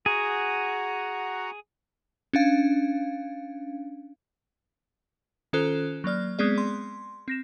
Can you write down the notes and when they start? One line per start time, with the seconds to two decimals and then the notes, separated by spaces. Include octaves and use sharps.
0.06 F#4 G#4 F#5 A#5
2.33 C#4 D4 F5
5.53 D#3 C#4 F4 A4 C5 F#6
6.04 F#3 A#3 D5 F6
6.39 G#3 B3 C4 G#4 D5
6.58 C6
7.28 C4 A#6 E7